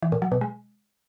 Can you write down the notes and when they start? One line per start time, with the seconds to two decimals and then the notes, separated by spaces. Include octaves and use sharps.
0.02 E3
0.12 A#2
0.22 F#3
0.32 B2
0.41 G#3